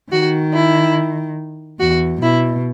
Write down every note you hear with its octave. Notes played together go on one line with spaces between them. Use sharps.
D#3 F#4
E4
E2 F#4
B2 E4